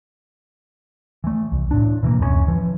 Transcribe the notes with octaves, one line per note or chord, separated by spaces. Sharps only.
E3 A3
C2
A2 D4
B2 E3 F3 A#3
D1 F#2 G3 C#4
E3 F3